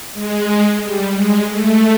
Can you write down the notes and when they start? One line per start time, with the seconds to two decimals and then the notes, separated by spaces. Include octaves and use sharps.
0.13 G#3
0.81 G3
1.15 G#3
1.49 A3